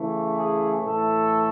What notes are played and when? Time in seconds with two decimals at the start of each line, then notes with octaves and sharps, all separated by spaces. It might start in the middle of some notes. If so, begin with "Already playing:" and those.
Already playing: C#3 E3 A3
0.36 G#4
0.84 A2 E3 A3 A4